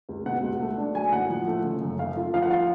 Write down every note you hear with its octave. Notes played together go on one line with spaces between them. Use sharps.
C#2
B2 F#5
C#2
A3
D4
F#3 G#5
A2 F#5
F3
A3
C#3
F#2
A3 F5
F4
F3 F5
F#5
F5